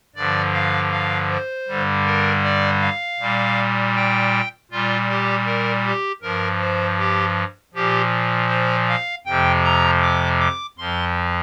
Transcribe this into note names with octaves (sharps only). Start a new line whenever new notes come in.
G2 D3 F3 D5
F5
F5
C5
G2 D3 G3
A#4
D5
F5
A#2 G3
G5
A#2 G3 F4
G4
A#4
G4
G2 F3 A#4
C5
G4
A#2 F3 G4
C5
F5
F2 C3 F3 G5
A#5
D6
D6
F2 F3 C6